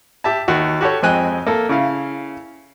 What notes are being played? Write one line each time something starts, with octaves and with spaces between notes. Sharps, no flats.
G4 E5 A5
D#2 F#4
F#4 G4 A4 C#5
F2 G#3 C4 G5 G#5 F#6
A#3 A4
C#3 E4 F5